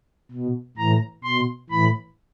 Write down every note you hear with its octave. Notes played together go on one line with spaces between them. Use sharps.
B2
A2 E3 A#5
B2 C6
A2 E3 B5